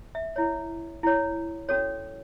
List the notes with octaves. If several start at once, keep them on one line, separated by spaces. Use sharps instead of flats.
E5
E4 C#5
E4 C#5
C#4 F#4 A4 C#5